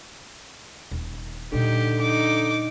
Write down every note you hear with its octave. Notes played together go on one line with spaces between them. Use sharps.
D#1
A#2 D3 G3 D#4 G4
D#4 D6